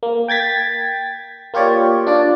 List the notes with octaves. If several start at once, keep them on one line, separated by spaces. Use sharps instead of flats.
A#3
G5 G#6 A6 B6
A#3 F4 G4 C#5 D5
D4 F4 D5